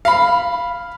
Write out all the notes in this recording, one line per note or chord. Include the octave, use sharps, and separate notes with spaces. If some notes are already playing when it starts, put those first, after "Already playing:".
F5 B5